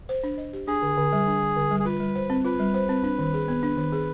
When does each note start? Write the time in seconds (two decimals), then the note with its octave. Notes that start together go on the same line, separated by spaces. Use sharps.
0.09 C5
0.24 D4
0.38 D#5
0.53 G4
0.68 D4 G#4
0.82 D3
0.97 D3
1.13 G3
1.27 D4
1.41 D3
1.56 D3
1.71 G3
1.80 G#4
1.85 F4 B4
2.00 G3
2.15 C5
2.30 C4
2.45 F4 B4
2.60 G3
2.74 C5
2.89 C4
3.04 D4
3.19 D#3
3.34 G#4
3.48 B3
3.63 D4
3.77 D#3
3.92 G#4